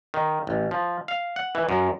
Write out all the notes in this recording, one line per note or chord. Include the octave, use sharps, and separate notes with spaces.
D#3
A1
F3
F5
F#5
E3
F#2